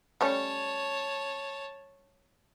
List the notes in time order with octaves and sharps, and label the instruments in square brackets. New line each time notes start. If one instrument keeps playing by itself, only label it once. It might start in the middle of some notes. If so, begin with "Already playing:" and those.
[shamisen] G3 A3 C#4 [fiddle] C#5 A5